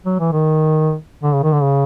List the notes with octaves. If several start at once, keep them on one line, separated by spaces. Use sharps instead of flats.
F#3
E3
D#3
D3
C#3
D#3
D3
C#3